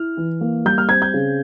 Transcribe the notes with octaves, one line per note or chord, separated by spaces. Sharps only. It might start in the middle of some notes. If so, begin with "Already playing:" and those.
Already playing: E4 F6
E3
A#3
G3 G6
F6
C4 G#6
G6
C#3